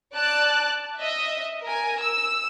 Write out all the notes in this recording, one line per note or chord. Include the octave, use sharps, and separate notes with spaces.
D5 A5 F#6
D#5 E5
A#4 G#5
E6